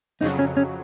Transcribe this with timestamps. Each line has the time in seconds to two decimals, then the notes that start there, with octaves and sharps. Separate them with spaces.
0.21 F2 C#3 F#3 D#4
0.39 C#4
0.57 C#4